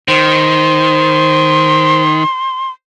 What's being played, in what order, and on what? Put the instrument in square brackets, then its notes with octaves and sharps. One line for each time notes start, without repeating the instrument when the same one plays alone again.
[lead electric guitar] D#3 [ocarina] C5 [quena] C6